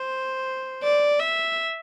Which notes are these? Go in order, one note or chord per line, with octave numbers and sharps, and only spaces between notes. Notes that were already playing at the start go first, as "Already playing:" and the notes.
Already playing: C5
D5
E5